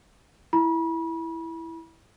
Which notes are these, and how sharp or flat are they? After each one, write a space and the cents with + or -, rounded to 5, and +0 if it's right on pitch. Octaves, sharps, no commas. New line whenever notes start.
E4 +0 B5 -35